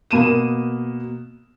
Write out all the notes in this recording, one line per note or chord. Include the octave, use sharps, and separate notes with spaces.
B2 A#3 D#7 E7